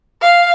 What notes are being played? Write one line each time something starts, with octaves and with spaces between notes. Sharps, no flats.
F5